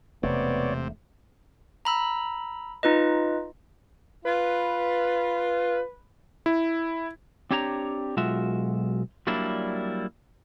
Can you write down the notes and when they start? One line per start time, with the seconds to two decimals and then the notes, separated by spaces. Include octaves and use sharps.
0.23 E1 C3 A3 B3 C#5 D5
1.85 A#5 B5 E6
2.83 D#4 F4 B4 D#5
4.25 F4 B4
6.46 E4
7.51 C4 D4 G4 C#5 F#5 A#5
8.17 B1 G#3 F4 F#4 E5
9.27 F#3 G3 A#3 D4 E4